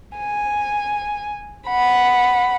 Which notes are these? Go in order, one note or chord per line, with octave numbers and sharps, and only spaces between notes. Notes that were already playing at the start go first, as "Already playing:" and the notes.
G#5
F#5 B5